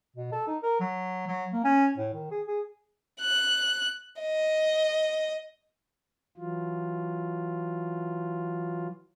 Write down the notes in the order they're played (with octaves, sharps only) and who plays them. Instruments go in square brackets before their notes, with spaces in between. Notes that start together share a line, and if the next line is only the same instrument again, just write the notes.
[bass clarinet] B2
A4
D#4
A#4
F#3
F#3
A#3
C#4
A2
D#3
G#4
G#4
[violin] F#6
D#5
[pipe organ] E3 F#3 F4